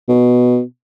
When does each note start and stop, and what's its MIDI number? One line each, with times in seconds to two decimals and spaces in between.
0.09 0.62 47